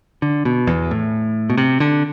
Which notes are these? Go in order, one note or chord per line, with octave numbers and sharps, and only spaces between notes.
D3
B2
E2
A2
B2
C3
D3